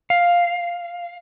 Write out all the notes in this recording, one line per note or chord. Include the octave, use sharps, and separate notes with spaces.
F5